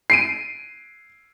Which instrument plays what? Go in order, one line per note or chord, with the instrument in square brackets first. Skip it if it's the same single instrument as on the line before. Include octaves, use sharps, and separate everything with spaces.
[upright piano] C7 D7 D#7